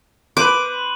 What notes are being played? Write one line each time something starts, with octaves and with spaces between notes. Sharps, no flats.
B4 C5 D6 F#6 D#7 F#7